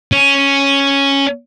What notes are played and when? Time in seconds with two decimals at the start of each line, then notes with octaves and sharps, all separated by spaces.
0.12 C#4